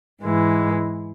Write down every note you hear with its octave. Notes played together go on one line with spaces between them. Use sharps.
G#2 E3 G#3